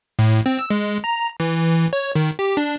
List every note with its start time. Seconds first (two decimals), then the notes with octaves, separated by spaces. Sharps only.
0.19 A2
0.46 C4
0.59 E6
0.70 G#3
1.04 A#5
1.40 E3
1.93 C#5
2.15 D#3
2.39 G4
2.57 D4